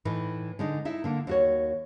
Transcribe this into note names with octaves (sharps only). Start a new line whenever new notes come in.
A2 E3 A3 D#4
D3 G#3 D#4
D#4 E4 E5
D3 A#3
D#2 F#4 C#5